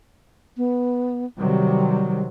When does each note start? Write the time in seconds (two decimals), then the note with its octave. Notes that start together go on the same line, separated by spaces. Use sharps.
0.57 B3
1.38 C3 D#3 F#3 G3